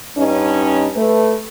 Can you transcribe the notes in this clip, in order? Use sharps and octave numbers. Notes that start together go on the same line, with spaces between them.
G2 C#4 D#4
A3 B4